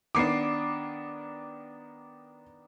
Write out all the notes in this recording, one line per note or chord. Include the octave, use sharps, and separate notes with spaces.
D#3 B3 D4 D6 C7